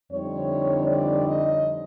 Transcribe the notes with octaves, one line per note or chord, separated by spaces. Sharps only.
F2 D3 G3 C4 D#4 C#5
D5
D#5